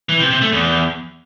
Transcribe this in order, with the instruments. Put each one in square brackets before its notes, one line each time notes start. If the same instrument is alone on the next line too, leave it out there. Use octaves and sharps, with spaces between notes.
[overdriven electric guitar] E3
C3
C3
A3
E2